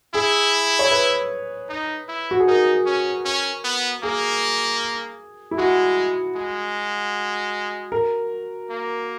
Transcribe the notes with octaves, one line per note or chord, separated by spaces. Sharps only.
E4 G#4
C#5
B4
D#4
E4
F#4
G#4
D#4 A#4
C#4
C#4
B3
A#3 G#4
E4
G#3 F#4
G#3
A#4
A#3